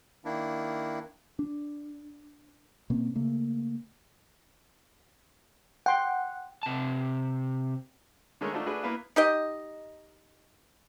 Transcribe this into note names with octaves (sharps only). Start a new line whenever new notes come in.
D#3 A#3 D4 E4
D4
B2 A#3 C4 C#4
C#3 A3 A#3
F#5 G5 C6
C3 A5
D3 D#3 G#3 A3 A#4 C#5
A3 D4 D#4 F4 F#4 C5
A3 D4 F#4 G#4 B4
A#3 B3 E4 B4 F5
D#4 G4 D#5